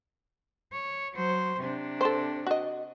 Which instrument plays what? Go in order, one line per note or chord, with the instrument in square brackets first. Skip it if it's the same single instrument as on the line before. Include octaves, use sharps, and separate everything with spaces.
[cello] C#5
F#3 C5
C3 D4
[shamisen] A4 C5
F#4 D#5